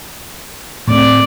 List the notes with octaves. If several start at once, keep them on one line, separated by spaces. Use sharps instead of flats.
A2 A3 C4 D5